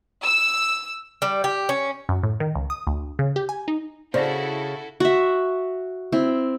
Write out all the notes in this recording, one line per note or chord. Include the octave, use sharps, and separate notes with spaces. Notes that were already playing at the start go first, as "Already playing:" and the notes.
E6
G3
G4
C#4
F#2
A2
D#3
C#2
D#6
D2
C#3
G4
G#5
D#4
C#3 E4 F#4 A4 C5 D5 A#6
F#4 E5
C4 E4